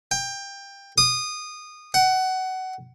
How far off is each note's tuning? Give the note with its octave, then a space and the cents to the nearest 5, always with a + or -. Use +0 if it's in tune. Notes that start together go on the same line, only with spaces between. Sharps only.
G5 +20
D#6 -20
F#5 +20